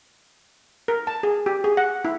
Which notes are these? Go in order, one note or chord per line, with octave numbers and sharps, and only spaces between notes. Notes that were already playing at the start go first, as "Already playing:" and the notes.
A#4
A5
G#4
G4
G#4
F#5
E4